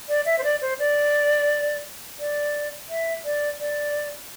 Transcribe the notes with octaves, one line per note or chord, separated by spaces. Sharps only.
D5
E5
C5
D5
C5
D5
D5
E5
D5
D5